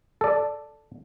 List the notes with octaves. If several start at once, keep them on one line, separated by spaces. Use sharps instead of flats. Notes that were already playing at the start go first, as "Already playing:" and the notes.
A4 D5